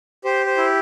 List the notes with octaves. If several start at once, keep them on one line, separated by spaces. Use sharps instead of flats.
G4 C5
C5
E4